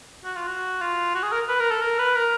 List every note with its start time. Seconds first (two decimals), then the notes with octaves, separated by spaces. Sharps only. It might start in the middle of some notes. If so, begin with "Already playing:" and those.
0.24 F#4
0.36 F4
0.47 F#4
0.81 F4
1.15 F#4
1.23 G#4
1.32 A#4
1.48 B4
1.60 A#4
1.71 A4
1.82 A#4
1.99 B4
2.15 A#4